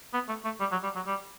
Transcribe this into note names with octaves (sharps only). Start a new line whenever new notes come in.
B3
A3
A3
G3
F#3
G3
F#3
G3